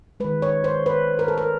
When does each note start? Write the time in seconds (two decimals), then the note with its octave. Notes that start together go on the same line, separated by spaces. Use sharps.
0.20 D#3 G#3 B4
0.42 C#5
0.64 C5
0.86 B4
1.19 A#4
1.28 A4
1.38 A#4